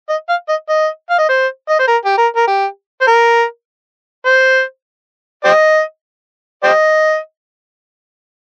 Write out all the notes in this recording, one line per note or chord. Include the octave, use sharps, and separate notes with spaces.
D#5
F5
D#5
D#5
F5
D#5
C5
D#5
C5
A#4
G4
A#4
A#4
G4
C5
A#4
C5
G4 C5 D#5
G4 C5 D#5